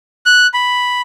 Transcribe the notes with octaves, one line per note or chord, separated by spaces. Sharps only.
F#6
B5